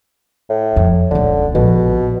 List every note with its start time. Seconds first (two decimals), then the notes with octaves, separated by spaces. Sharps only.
0.50 A2
0.76 F2
1.11 D#1 C#2 D3
1.55 A#1 B2 G#3